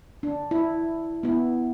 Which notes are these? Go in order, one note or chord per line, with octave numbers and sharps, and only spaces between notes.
D4
E4
B3 E4